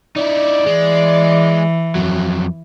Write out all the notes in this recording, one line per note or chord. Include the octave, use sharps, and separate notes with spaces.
D#4 E4 D5
E3 G#3
F2 F#3